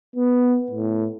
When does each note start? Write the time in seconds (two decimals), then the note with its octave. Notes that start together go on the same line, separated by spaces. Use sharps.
0.16 B3
0.71 A2